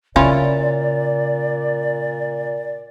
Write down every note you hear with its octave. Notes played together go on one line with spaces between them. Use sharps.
A#2 C#3 C#4 E4 F4 D5